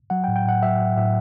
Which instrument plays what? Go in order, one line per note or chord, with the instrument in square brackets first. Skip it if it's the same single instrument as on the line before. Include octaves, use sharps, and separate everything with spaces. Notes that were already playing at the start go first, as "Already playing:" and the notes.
[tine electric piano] F#3 F#5
G5
A2
G5
A2 F#5
F#3 E5
A2
A2 E5